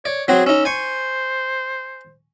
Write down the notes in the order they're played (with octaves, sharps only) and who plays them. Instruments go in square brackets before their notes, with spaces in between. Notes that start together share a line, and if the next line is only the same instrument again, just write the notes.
[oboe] C#5 [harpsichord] D5
[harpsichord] F#3 C4 F#4 [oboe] G#4
[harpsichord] C#4 D#4 [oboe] E6
[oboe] C5 [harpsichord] G#5 C#6